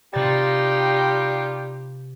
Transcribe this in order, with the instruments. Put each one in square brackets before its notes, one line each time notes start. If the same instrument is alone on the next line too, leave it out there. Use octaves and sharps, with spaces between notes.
[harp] C3 A6 [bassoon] G3 [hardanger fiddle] D#4 F4 [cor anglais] G4